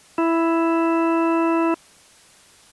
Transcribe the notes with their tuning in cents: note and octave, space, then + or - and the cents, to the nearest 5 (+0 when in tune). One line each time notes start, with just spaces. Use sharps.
E4 +5